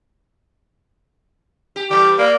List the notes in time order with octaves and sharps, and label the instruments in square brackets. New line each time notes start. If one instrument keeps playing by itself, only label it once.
[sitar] G4
[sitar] E3 G3 A3 [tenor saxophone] G4
[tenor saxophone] A#3 [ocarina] D5